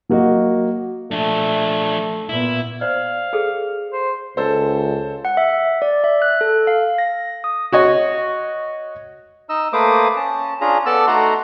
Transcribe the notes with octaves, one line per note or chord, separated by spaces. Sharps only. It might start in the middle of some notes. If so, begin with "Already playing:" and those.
F#3 A#3 F#4 D#5
F3 A3 D4
A#2 B3 E4
C5 D5 F5
G#4 A4
C5
C#2 A4 C5
F#5
E5
D5
E5
F#6
A4
F5
A#6
D#6
F#4 C#5 D#5
D#4 D#5 E6
A3 A#3 B4 C5 D6 D#6
C#4 A5
C#4 D4 F4 G#4 A#5
B3 A4 D5 A5 E6
A3 D#4 F#4 F#5 A#5 C6